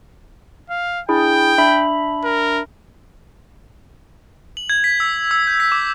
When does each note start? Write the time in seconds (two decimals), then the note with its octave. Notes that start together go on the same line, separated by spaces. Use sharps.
0.70 F5
1.09 D4 E4 G#4 G5
1.58 D4 E5 B5
2.24 A#4
4.57 F#7
4.69 G#6
4.84 B6
5.00 E6
5.31 E6
5.47 G6
5.60 B6
5.72 D6